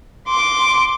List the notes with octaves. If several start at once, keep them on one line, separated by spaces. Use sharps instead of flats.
C6 D6